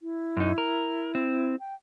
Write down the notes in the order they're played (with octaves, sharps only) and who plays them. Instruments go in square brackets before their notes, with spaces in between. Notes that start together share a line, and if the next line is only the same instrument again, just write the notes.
[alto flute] E4
[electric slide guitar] F#2 D#4
A#4
C4
[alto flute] G5